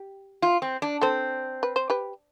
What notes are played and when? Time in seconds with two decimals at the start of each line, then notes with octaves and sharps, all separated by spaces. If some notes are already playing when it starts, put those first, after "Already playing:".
Already playing: G4
0.42 F4
0.62 C4
0.82 D4
1.01 C4 A4 C5
1.63 B4
1.76 C5
1.90 G4 B4